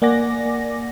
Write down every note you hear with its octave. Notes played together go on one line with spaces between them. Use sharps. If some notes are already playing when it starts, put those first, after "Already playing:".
A#3 D5 F#5 G#5 D6 A#6